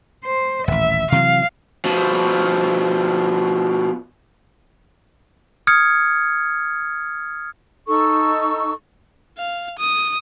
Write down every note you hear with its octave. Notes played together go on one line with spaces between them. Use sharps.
C5
D#1 A1 E5
C3 E3 F#3 F5
B2 F3
D#6 F6 G#6 C#7
D#4 A4 C#6 E6
F5
D#6